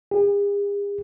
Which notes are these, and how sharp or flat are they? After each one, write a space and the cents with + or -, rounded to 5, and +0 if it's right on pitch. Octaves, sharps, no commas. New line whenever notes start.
G#4 -45